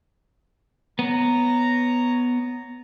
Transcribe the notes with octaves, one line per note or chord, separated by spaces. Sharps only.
B3 C#5 A#5